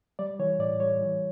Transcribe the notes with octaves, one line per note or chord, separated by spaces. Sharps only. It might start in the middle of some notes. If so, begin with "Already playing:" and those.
G3 D5
E3 C#5
A2 D5
G3 C#5
E3